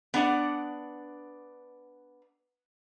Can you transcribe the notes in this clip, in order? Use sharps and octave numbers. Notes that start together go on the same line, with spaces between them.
B3 D4 D5 F#5